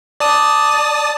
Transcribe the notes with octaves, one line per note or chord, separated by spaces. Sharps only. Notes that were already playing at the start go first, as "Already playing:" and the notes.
D5 A5 D#6